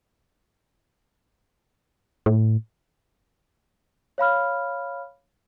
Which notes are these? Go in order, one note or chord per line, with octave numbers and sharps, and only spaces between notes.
A2
C#5 F5 B5 F6